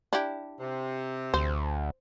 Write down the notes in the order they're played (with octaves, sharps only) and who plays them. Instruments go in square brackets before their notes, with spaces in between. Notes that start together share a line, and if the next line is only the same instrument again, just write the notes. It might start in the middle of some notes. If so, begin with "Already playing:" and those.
[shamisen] D4 E4 G4
[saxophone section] C3
[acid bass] D2 [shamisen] C5